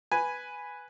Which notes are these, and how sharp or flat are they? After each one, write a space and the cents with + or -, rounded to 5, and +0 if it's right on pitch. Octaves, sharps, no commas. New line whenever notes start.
B4 +0 G#5 +0